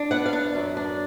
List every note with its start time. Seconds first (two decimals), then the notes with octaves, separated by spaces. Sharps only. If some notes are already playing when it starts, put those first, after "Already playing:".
Already playing: D4
0.11 B3 F#5
0.26 F5
0.33 D4
0.55 F#2
0.77 D4